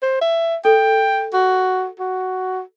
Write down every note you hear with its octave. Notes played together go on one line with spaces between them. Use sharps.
C5
E5
A4 G5
F#4
F#4